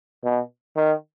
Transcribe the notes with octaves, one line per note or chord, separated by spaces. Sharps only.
B2
D#3